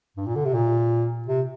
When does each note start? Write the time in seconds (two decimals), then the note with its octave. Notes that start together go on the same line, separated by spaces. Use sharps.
0.17 G2
0.26 A#2
0.36 D3
0.45 C3
0.54 A#2
1.28 C3